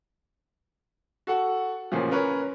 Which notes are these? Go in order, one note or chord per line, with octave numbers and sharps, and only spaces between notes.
F#4 A4 F#5
A1 A#2 C#3 F3
C#4 A#4 B4 C#5